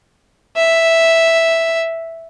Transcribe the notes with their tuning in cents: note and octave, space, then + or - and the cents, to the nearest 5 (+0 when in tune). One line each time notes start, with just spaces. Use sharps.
E5 +0